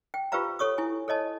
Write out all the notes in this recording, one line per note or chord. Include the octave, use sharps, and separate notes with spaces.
G5
F4 G4 B4 C5 F5 A#5
A4 C#5 C#6 D#6
E4 G#5
A4 C#5 D#5 A5